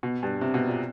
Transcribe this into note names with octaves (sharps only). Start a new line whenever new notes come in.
B2
G2
C3
B2
A#2